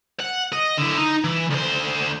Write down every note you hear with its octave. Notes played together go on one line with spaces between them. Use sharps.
F#5
D#5
D3 E4
D#4
E3
D2 C5